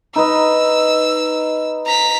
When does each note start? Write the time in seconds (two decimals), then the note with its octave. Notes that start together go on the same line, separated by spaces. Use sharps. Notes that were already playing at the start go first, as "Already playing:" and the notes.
0.16 D#4 B4 D#5 E6
1.87 A#5 B6